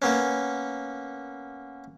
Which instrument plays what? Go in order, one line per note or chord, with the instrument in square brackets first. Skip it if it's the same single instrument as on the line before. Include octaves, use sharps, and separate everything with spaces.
[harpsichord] A#3 B3 C#4